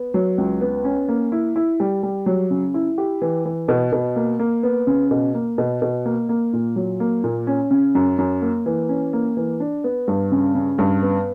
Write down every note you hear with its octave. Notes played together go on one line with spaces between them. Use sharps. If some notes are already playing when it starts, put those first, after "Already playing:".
Already playing: B3
F#3
C#2
B3
C#4
A#3
E4
E4
G3
G3
F#3
C#3
E4
G4
E3
E3
B2
B2
A#3
A#3
B3
C#3
B2
A#3
B2
B2
A#3
A#3
A#2
F#3
A#3
A#2
C#4
C#3
F#2
F#2
A#3
E3
C#4
A#3
E3
D4
B3
G2
C#3
C#3
G2
B3